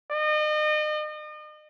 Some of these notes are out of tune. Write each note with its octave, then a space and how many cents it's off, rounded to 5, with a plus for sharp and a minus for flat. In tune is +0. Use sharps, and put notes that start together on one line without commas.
D#5 -40